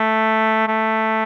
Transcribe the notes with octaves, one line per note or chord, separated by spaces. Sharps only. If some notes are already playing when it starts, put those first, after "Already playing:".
Already playing: A3
A3